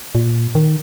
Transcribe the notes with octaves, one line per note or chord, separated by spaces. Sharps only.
A#2
D#3